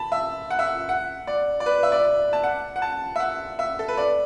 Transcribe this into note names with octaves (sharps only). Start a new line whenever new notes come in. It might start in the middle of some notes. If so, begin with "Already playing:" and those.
Already playing: A5 B5
E5
F#5
E5
F#5
F#5
D5
D5
B4
E5
D5
A5
F#5
F#5
A5
E5
F#5
E5
A4
B4
D5